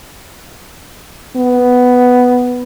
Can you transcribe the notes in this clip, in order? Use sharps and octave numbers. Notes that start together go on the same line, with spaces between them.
B3